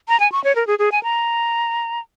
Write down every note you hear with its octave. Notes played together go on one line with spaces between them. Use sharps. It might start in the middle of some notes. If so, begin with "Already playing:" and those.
A#5
G#5
C#6
C#5
A#4
G#4
G#4
G#5
A#5